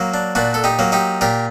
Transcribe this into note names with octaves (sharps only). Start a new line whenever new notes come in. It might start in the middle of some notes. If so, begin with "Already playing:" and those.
Already playing: F#3 A#3
D4
A#2 D4 F#4
A4
D#4 G4
F#3 A#3
D#4 G4
A#2 G4 A#4